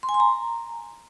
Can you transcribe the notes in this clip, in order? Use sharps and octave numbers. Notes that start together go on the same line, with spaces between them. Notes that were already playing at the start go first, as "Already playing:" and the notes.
C6
G#5
C6
A#5